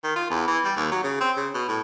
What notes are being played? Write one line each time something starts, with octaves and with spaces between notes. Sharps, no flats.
D#3
F4
E2
E3
G3
D#2
F#3
C#3
C4
C#3
B2
A2